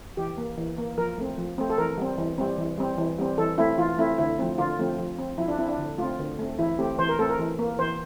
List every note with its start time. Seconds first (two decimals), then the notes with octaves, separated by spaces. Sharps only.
0.17 E3 G4
0.38 A#3
0.58 E3
0.78 A#3
0.98 F3 A#4
1.18 A3 C4
1.38 F3
1.58 A3 C4
1.70 A4
1.78 E3 A#4
1.98 G3 C4
2.18 E3
2.38 G3 C4
2.58 E3
2.78 G3 C4
2.98 E3
3.18 G3 C4
3.38 E3 A4
3.58 A3 C4 E4
3.78 E3 F4
3.98 A3 C4 E4
4.18 D3 E4
4.39 F3 A3 C4
4.58 D3 F4
4.79 F3 A3 C4
4.98 F3
5.18 C4
5.38 F3 E4
5.48 D4
5.58 C4 E4
5.68 D4
5.78 D3
5.98 A3 C4 F4
6.19 D3
6.39 A3 C4
6.59 E3 E4
6.79 A3 C4 G4
6.98 E3 C5
7.09 A#4
7.19 A3 C4 A4
7.30 A#4
7.39 E3
7.59 A#3
7.79 E3 C5